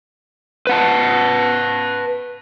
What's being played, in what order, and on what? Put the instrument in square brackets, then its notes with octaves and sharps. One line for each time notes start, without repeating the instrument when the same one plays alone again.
[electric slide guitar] B4 F#5 A5